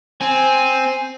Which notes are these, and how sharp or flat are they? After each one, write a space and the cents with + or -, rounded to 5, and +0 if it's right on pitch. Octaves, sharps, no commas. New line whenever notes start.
C4 +0 G#5 +0